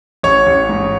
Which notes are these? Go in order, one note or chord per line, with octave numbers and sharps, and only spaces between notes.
A1 C#5
A1
G#2